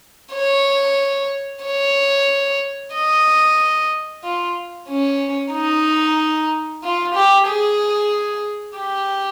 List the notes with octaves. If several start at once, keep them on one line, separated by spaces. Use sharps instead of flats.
C#5
C#5
D#5
F4
C#4
D#4
F4
G4
G#4
G4